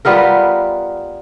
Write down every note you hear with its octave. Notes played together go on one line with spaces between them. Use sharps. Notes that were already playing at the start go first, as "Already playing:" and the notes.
G3 B3 F4 A#4